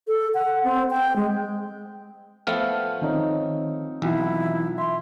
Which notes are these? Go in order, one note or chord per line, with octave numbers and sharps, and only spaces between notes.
A4
F#5
C4
G5
G#3
F3 A3 B3 F4 G5 F6
D#3 C4 D#4 C#5
B1 E3 E4 F4
E5 C6